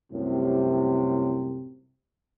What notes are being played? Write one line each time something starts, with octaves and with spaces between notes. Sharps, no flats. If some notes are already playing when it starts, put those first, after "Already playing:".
C2 F#2 A2 C3